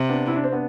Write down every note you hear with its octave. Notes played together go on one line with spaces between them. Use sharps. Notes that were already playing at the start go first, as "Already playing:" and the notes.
Already playing: C3
B3 D4
E4
D4
C4
B3 D4